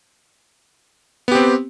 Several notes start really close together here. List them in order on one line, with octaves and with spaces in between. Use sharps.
B3 G4 C4